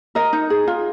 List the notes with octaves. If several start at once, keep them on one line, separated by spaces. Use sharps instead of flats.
A#4 D#5
D#4
G#4
F4